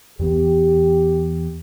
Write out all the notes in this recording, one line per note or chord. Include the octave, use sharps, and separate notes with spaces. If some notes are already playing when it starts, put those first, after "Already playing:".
E2 E3 B3 G4